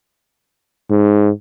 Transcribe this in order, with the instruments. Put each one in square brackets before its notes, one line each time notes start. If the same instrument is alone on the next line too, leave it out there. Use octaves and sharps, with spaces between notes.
[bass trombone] G#2